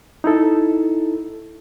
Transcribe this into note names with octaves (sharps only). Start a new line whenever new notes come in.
D#4 E4 A4